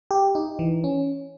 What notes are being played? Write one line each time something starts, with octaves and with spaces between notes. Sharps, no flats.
G4
D#4
E3
C#4